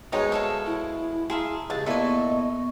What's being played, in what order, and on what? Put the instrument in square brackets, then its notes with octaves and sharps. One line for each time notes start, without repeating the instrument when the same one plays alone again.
[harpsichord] B2 G#3 [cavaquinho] D#4 G5 [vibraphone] C5 [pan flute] C#5
[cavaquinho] A4 C#5 F5 [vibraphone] E5 [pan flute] A5
[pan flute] E4
[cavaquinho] G#4 E5 F5 [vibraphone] A5 A#5 C6
[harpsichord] C#2 [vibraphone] G4 [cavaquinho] A5
[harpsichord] A#2 G#5 [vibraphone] B3 C#6 [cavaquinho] E4 A4 [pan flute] D#5